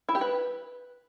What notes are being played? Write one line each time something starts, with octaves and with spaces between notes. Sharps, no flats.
E4
G4
B4